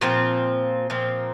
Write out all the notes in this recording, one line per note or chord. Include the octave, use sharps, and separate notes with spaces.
A#2 F3 C4
A#2 F3 C4